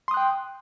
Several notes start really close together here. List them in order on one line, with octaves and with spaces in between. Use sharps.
C6 D#6 F#6 G5